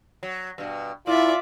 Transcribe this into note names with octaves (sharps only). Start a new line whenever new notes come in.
F#3
G2 B2
A#2 E4 F4 D5 E5